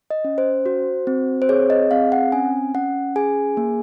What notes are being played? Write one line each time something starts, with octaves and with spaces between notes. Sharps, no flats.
D#5
C#4
C5
F#4
C4
C5
G#4 C#5
D#5
C4 F5
F#5
C#4 G#5
C#4 F#5
G#4 G#5
A#3